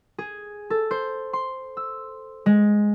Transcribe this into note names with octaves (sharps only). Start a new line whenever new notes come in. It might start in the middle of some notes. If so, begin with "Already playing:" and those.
G#4
A4
C5
C6
E6
G#3